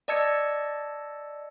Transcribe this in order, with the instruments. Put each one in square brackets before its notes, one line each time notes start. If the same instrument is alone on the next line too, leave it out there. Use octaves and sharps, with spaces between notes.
[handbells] D5 D#5 A5 E6 G#6 C#7